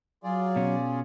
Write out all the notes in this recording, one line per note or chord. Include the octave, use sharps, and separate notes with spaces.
F#3 F4 G#4 D5
B2 C#4